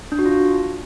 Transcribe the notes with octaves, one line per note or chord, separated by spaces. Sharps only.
D4
F#4
F4